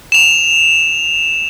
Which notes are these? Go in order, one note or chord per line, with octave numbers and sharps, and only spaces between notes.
E7 F7